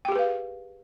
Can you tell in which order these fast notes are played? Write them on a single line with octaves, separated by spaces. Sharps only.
G5 G4 G#4 B4 F5